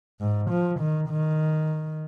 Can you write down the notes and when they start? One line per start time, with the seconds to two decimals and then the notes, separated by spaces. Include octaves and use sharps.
0.20 G#2
0.51 F3
0.80 D#3
1.10 D#3